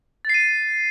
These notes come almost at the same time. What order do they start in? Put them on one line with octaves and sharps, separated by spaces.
A6 C7 D#7